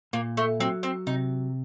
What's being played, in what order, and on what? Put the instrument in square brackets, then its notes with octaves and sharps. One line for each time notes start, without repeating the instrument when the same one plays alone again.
[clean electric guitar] A#2 [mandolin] A#3
[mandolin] A3
[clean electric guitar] F#3 [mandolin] C4
[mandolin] C4
[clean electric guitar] C3 [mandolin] D#4